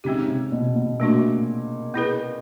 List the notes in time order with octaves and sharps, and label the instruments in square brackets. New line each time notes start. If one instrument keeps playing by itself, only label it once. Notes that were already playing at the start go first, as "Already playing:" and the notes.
[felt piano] C#3 [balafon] G#3 C4 D#4 G4
[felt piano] C3
B2
B2
[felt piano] A#2 [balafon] A3 D4 F#4
[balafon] B3 E4 G#4 B4